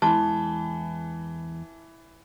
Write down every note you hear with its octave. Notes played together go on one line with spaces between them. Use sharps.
E2 E3 G#3 A5 C6